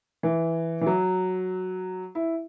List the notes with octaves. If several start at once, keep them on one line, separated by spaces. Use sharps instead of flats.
E3
E3
F#3
E4